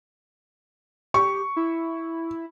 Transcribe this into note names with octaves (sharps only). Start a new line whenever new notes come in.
G4 C#6
E4